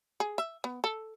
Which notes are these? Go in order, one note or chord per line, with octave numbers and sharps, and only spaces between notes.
G#4
E5
B3
A4